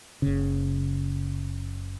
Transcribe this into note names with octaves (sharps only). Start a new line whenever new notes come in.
F#1 C#3